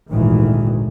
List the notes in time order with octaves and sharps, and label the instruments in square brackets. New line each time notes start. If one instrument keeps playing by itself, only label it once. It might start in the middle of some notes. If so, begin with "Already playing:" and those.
[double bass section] G#1 D2 A#2 D#3 E3